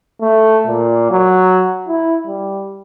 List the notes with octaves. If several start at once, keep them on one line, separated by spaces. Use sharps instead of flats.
A3
A#2
F#3
E4
G3